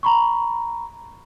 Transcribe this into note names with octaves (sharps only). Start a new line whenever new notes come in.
A#5 B5 C#6